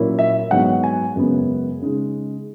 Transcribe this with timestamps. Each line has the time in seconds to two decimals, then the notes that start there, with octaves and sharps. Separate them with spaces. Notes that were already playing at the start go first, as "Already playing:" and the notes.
Already playing: A#2 F#3 A#3 C#4 E4
0.19 E5
0.51 G#2 F#3 B3 D#4 F#5
0.84 G#5
1.16 F#2 C#3 G#3 B3
1.82 C#3 G#3 D#4